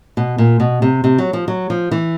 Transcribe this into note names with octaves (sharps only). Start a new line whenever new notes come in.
B2
A#2
B2
C3
C3
F#3
F3
F#3
F3
E3